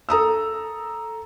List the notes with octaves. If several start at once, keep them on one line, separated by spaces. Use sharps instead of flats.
A4 A#5 D#6 E6